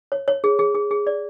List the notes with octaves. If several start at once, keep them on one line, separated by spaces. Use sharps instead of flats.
C#5
C#5
G#4
G#4
G#4
G#4
D5